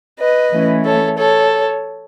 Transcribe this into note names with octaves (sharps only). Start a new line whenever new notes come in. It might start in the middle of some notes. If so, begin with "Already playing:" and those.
B4 D#5
E3 A3 C#4 E4
A4 C#5
A4 C#5